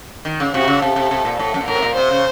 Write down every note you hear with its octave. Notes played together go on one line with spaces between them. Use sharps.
D#3
C#3
C3 F#4
C#3
C3 A4
C3
C3
A#2
A2 A4
F#2
A#2
A2 A#4
C3
A#2
C3 C5
C#3